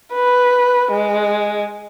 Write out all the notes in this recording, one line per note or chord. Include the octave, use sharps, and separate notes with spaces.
B4
G#3